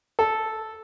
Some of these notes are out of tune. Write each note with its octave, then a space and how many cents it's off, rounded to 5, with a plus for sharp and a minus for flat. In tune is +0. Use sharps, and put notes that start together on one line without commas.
A4 -5